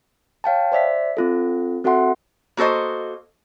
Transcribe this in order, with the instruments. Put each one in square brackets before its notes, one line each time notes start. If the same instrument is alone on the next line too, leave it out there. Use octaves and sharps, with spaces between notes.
[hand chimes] C#5 F5 G5 A5
C5 D5 E5 B6
C4 F4 A4
C4 F#4 A4 E5 F#5 C6
[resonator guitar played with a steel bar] A#3 F#4 A4 C5 D#5